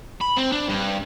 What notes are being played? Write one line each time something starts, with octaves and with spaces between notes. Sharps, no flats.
B5
C4
D4
G2